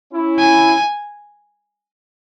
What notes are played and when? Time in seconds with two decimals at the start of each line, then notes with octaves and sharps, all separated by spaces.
0.11 C#4 E4
0.40 G#5